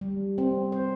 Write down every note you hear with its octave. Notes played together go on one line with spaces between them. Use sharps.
G3
C4
C5